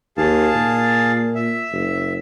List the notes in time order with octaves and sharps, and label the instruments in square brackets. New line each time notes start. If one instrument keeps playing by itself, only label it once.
[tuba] D#2 [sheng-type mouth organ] G#4 F5 A5
[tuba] A#2
[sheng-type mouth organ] E5
[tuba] F#1